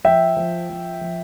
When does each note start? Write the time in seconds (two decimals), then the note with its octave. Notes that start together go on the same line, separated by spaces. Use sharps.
0.05 F3 E5 G5
0.37 F3
0.70 F3
1.01 F3